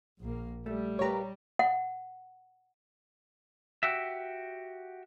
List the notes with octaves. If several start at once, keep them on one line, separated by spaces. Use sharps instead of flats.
A#1 A#3
G3 A3
A#3 G4 B4 C#5 A#5
F#5
F#4 G4 E5